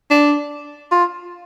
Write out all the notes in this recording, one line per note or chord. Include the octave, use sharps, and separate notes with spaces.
D4
F4